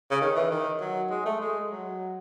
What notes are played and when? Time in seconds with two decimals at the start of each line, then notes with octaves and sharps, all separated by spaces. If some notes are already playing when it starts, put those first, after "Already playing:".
0.11 C#3
0.21 D#3
0.36 E3
0.51 D#3
0.81 F#3
1.10 G#3
1.25 A3
1.41 G#3
1.71 F#3